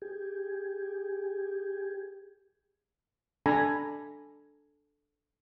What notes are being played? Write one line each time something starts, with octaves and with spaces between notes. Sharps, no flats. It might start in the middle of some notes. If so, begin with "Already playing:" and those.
G4 G#4
D4 A4 G#5 A#5 B5